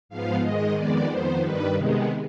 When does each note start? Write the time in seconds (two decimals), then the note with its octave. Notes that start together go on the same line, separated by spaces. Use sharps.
0.09 G#2 F3 B3 F5
0.42 G#2 D#3 G#3 D#5
0.75 F2 D#3 G#3 B3 D5
1.08 F2 D#3 B3 C5
1.41 G2 D#3 G3 B4
1.75 C3 D#3 G#3 B3